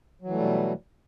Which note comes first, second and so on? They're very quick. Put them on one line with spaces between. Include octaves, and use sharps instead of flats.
F#3 E3 A3 G3 B2